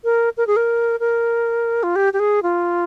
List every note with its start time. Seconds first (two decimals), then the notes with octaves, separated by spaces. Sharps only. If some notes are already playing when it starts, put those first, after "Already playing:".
0.04 A#4
0.37 A#4
0.47 G#4
0.56 A#4
1.00 A#4
1.83 F4
1.96 G4
2.13 G4
2.20 G#4
2.43 F4